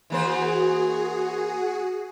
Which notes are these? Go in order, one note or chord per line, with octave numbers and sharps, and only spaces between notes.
E3 A#3 F#4 G#4 C5